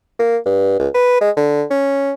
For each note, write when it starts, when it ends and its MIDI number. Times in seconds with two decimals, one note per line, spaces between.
0.20 0.37 58
0.46 0.79 43
0.79 0.88 37
0.94 1.16 71
1.21 1.30 56
1.37 1.64 50
1.71 2.13 61